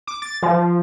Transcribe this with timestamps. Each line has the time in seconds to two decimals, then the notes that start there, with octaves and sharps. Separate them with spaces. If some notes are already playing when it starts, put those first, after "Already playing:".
0.07 D6
0.22 A6
0.43 F3